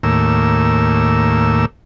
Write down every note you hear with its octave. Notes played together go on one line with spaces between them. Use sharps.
D#2 A2 A#3 E6